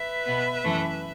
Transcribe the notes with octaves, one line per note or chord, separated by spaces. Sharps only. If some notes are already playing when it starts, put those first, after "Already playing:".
Already playing: B4 E5
B2 B3
F#2 E3 A3